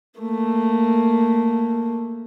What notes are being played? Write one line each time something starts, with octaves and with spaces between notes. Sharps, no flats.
A3 A#3